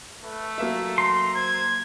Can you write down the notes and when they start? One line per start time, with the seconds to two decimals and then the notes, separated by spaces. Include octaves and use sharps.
0.23 A3 B4
0.58 F#3 A#3 A4 E5
0.98 A#5 C6
1.35 C5 G#6